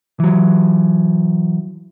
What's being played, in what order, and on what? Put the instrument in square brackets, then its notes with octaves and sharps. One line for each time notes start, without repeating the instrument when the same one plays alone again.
[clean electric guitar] E3 F#3